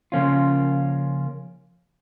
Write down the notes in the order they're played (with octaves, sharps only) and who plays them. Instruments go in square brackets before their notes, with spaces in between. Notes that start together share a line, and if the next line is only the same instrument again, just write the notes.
[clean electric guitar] C#3 F3 A#3 C#4 F4